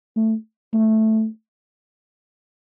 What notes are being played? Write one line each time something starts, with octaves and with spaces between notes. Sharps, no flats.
A3
A3